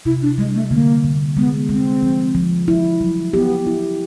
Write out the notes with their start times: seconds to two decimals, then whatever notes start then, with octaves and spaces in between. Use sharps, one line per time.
0.05 C3 E4
0.22 D4
0.38 G3 G#3
0.55 A3
0.71 D3 A#3
1.04 D3
1.37 G#3 B3
1.69 G#3 C4
2.03 F3
2.35 F3
2.68 E4
3.01 F#3
3.33 B3 G4
3.67 E4